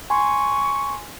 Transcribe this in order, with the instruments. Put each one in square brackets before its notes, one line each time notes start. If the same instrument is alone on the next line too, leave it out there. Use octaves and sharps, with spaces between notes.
[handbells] G#5 C6 [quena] C#6